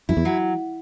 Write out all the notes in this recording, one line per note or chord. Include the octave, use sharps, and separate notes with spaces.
F#2 E4
E2
F#3